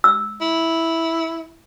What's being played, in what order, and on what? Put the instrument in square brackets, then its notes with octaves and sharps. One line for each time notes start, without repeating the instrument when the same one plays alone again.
[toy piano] E6
[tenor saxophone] E4